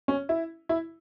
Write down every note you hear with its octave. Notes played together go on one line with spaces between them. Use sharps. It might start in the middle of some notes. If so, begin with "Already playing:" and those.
C#4
E4
E4